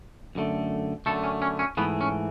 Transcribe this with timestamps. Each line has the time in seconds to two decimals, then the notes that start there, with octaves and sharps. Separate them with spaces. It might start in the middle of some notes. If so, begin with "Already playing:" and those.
0.35 F#2 D3 A3
1.06 F#2 D3 A3 A4
1.24 C#4
1.42 C#4
1.59 C#4
1.77 G#2 E3 A3 B3
2.01 C#4